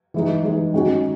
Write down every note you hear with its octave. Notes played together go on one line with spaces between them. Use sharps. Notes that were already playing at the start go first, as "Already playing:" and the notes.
E3 G#3 D#4
E3 G#3 D#4
D#3 G#3 C#4 F#4